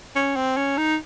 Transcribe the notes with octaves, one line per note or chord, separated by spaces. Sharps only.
C#4
C4
C#4
D#4